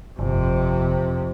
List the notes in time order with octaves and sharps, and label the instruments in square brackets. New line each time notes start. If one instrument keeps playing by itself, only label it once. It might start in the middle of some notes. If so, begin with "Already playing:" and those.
[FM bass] G1 [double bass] F2 C3